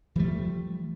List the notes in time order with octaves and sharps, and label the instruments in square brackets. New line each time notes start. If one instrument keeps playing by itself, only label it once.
[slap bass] E3 F3 G3 A3